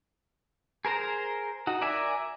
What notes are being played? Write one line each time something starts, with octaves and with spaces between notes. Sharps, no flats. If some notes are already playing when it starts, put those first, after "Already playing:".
G#4 A#4 C5 A#5
D#4 F#4
A#4 D5 E5 G#5